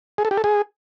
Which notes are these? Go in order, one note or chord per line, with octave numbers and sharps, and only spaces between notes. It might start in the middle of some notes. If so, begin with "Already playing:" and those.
G#4
A4
G4
A4
G#4